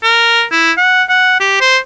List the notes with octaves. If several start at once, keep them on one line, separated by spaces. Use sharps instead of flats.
A#4
E4
F#5
F#5
G4
C5